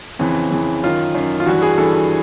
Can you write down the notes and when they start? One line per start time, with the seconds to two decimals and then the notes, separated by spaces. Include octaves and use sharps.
0.19 F2 C#3 E3
0.51 F2 C#3 E3
0.83 F#2 D#3 F4
1.15 F#2 D#3
1.40 F4
1.46 G2 E3 F#4
1.62 G#4
1.78 G2 E3 A4